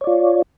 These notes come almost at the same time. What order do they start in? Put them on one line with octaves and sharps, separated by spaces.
C#5 D5 F4